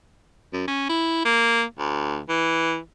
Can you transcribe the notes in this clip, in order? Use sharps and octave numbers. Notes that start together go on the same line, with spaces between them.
F#2
C#4
E4
A#3
D2
E3